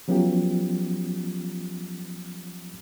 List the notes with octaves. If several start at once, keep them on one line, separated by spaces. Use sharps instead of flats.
F3 F#3 B3 C#4 F4 G4